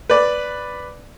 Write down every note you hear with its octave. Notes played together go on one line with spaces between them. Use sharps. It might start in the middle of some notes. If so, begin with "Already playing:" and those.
B4 D5